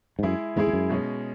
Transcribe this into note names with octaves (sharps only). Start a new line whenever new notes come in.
G#2
F#2 G#3 E4 G#4
E2 G#2 G#3 E4 G#4
E2
F#2
B2 G#3 C#4